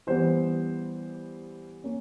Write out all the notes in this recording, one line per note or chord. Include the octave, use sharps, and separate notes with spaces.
E3 G3 B3 C5
A#3 C#4